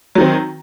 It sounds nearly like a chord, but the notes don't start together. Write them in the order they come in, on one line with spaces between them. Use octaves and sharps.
F#3 D#3 C4